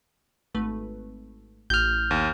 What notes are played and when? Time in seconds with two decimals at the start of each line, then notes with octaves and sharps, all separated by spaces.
0.55 G#1 A3 B4
1.70 A1 F6 G6
2.11 D#2